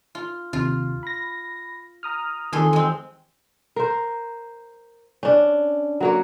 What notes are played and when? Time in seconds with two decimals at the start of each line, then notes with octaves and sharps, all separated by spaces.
0.15 F4
0.53 D#2 C3 F4
1.03 B5 A#6
2.03 A#5 D#6 F6
2.52 F2 D#3 E3 G#4 A4 C6
2.73 G#3 C4
3.76 A#4 C5
5.23 C#4 D4
6.00 F#3 A#3 C#5